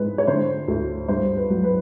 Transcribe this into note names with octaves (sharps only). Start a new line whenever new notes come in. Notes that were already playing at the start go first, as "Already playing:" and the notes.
Already playing: G#2 G#3 B4
C#5
D3 C5
D2
G2 C5
B4
F#3
B4